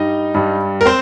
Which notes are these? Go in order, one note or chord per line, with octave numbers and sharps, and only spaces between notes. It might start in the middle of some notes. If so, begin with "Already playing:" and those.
Already playing: G2 G3 D#4 D#5
G2 G3
A#4
C4 C5